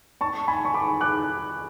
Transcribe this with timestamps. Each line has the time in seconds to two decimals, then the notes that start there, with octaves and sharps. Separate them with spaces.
0.21 A5 C#6
0.48 G#5 B5
0.65 C#6
0.74 B5 D6
1.01 D6 F#6